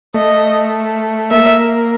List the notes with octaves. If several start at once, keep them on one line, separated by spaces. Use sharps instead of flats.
A3 D#5
A#3 E5